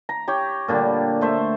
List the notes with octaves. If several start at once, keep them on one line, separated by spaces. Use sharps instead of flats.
A#5
G4 C#5 G5
A#2 D3 G3
A3 C5 E5